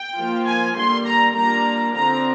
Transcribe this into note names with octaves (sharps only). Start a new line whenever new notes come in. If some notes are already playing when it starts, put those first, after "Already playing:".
Already playing: G5
F3 A#3 F4
G#5
D3 G3 A#3 C6
A#5
G3 A#3 D4 F4 A#5
D3 F3 C4 A#5